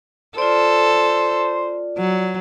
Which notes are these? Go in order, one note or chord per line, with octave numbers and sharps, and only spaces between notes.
F4 A4 C5 D5
F#3